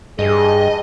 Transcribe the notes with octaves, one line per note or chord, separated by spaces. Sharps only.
G2 G#4 D#5